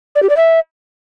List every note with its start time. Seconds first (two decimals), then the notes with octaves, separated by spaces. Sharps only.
0.15 D5
0.22 G4
0.29 D5
0.36 E5